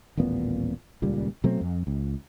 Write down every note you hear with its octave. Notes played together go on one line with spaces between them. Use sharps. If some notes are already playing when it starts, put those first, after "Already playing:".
D#1 A1 A#2 B3
D#1 C#2 A#2 G3
B2 F#3 A3 C4
F2
C#2